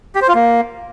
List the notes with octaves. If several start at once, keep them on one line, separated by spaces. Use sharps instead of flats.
G4
C5
F4
A#3